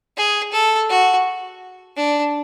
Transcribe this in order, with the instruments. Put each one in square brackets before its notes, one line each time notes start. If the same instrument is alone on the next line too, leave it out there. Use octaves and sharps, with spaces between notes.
[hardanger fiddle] G#4
A4
F#4
D4